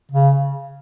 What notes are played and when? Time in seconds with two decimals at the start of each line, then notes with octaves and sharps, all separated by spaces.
0.12 C#3